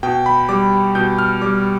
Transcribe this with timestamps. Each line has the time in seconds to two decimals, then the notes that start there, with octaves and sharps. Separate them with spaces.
0.03 B2 G5
0.26 B5
0.49 G3 D6
0.95 B2 G6
1.19 F6
1.41 G3 D6